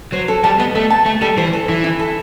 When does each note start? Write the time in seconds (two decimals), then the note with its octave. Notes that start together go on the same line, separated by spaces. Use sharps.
0.12 F#3 C5
0.28 A4
0.44 G3 A5
0.59 B3 D#5
0.75 A3 A4
0.90 A5
1.06 A3 A5
1.21 G3 A4
1.37 E3 C5
1.53 A4
1.69 E3 E4
1.84 E4
2.00 A4